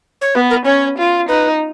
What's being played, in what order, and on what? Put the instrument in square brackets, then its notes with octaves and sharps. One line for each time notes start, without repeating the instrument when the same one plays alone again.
[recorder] C#5
[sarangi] B3 [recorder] B4
[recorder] A#4
[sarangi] C#4 [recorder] C#5
[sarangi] F4
[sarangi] D#4 [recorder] B4